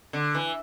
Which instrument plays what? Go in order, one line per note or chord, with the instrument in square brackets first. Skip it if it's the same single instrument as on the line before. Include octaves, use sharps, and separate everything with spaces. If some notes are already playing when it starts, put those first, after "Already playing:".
[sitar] D3
E3